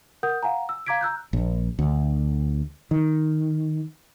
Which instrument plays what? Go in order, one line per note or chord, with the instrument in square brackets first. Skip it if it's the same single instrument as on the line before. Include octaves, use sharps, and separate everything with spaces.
[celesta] A#4 F#5 D#6 G6
F5 F#5 G#5 A#5
E6
F5 A#5 D6 G#6 B6 D7
A#5 E6 F#6 G6
[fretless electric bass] A#1
D2
D#3